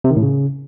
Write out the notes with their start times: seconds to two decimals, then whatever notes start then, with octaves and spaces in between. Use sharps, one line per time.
0.04 C3
0.10 D#3
0.16 A2
0.22 C#3